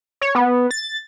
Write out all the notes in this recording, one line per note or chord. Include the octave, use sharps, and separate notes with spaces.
C#5
B3
A6